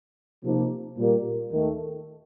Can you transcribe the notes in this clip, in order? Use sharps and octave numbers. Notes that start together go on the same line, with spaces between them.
C3 F3 A#3 D#4
A#2 G3 A#3
D#2 D#3 A3